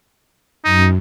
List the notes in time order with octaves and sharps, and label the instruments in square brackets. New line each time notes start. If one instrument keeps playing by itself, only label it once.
[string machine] F#2 [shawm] D#4